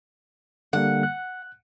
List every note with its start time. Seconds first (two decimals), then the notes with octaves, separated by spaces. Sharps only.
0.73 D3 G3 A#3 F#5
1.03 F#6